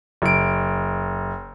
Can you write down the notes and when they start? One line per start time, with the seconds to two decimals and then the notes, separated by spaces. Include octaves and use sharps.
0.22 F#1 D7